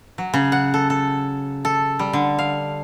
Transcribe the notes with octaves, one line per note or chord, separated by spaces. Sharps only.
F#3
C#3
F#5
A4
A4
A4
G3
D3
F5